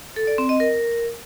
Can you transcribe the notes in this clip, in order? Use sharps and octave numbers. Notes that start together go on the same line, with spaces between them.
A4
D5
C4
D#5
A#4